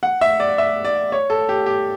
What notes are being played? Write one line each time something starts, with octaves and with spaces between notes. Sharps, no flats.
F#5
E5
D5
E5
D5
C#5
A4
G4
G4